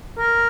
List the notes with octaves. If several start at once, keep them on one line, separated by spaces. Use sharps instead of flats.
A#4